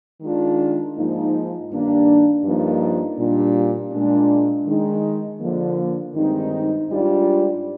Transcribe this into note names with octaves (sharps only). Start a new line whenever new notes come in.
D#3 G#3 D4 F4
G#2 F3 A#3 D#4
G2 D#3 A#3 D4
G2 F3 A#3 D#4
A#2 G3 D4
A#2 G#3 D4
D#3 G#3 D#4
D3 F3 A#3
G2 D#3 G#3 C4 D#4
G#2 G3 D4 F4